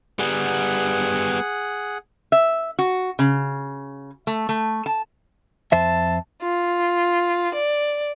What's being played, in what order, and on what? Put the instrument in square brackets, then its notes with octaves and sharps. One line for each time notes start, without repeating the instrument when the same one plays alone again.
[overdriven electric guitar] G3 B3 [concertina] G#4 F#5
[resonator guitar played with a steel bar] E5
F#4
C#3
A3
A3
A5
[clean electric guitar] F2 C5 E5 [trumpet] A5
[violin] F4
D5